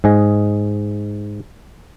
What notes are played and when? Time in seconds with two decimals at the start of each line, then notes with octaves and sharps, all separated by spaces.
0.04 G#2 G#4 D#5